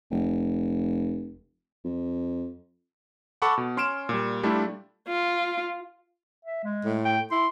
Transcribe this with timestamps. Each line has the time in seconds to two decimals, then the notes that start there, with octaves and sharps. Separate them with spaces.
0.11 F1
1.84 F2
3.42 A4 F#5 A5 B5 C#6 D6
3.58 B2
3.77 C#4 C6 F6 D7 E7
4.09 A#2 G3
4.43 G3 A3 D4 E4 F4
5.08 F4
6.45 E5
6.64 G#3
6.85 A2
7.05 G5
7.31 E4 C6